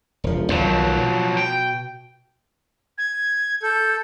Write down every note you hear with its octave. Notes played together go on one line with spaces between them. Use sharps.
E1 F3
B1 D#3 F3 F#3
B2
G5
G#6
A4 G6